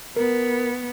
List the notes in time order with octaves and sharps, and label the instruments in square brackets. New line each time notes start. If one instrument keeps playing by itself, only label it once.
[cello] B3 [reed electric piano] A#4